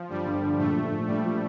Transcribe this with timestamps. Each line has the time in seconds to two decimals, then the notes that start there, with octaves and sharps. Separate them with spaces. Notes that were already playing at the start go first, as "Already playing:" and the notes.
Already playing: F3
0.09 G1 G3
0.26 G1
0.42 D3
0.58 A#1 A3
0.75 F3
0.92 A#1
1.07 A#1 G3
1.24 F3